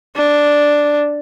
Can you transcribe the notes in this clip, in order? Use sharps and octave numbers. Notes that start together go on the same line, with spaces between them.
D4